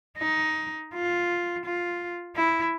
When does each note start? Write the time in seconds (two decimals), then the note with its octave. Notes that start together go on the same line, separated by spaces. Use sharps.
0.18 D#4
0.94 F4
1.65 F4
2.36 E4